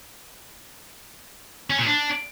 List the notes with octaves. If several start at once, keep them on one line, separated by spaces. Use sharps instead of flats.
C#4
A#2
D4